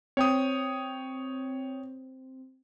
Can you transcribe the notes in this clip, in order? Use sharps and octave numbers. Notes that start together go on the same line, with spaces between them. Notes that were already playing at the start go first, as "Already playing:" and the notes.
C4 C#5 G5 D#6